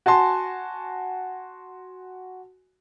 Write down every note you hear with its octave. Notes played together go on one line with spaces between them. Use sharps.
F#4 G#5 A5 C6